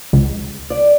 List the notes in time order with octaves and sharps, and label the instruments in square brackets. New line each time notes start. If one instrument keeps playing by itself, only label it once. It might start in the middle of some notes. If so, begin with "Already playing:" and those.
[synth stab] C#2
[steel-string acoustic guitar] D5